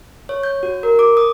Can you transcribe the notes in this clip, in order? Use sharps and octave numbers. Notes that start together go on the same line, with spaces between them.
C#5
G6
F#4
A#4
D6
D#6